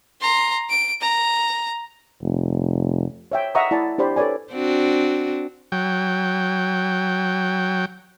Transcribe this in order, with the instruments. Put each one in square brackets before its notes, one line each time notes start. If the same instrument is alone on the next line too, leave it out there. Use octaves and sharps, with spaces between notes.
[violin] A#5 C6
D7
A#5
[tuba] F1
[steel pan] C#5 E5 G5
D#5 E5 F#5 A#5 C#6 D#6
E4 D5 A5
D4 G4 C5 D5 B5
A4 B4 C#5 D5 G#5
[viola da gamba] C4 D4 F#4
[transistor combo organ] F#3 G5